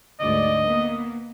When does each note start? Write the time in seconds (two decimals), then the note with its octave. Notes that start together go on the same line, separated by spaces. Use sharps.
0.20 D2 G#2 D5 D#5
0.66 A#3 B3